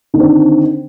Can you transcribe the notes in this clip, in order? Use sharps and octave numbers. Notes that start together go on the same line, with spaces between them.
D3 D#3 C4